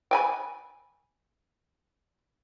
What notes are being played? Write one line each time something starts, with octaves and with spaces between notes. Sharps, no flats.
G5 G#5 B5